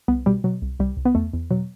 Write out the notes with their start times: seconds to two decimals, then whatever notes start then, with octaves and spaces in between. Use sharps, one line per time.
0.08 C2 B3
0.26 B2 G3
0.44 B2 F#3
0.62 C2
0.80 C2 G3
0.97 C2
1.05 B3
1.15 E2 A3
1.33 E2
1.51 B2 F#3